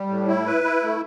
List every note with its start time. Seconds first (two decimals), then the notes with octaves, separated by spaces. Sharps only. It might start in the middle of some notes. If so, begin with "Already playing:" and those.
Already playing: G3
0.09 A2
0.27 E4
0.46 B4
0.64 E4
0.83 A3